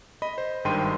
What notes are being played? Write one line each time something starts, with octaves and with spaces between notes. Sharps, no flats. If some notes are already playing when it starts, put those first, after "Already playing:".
D#5 B5
C5
G#1 G2 D#3 G5 C6 D#7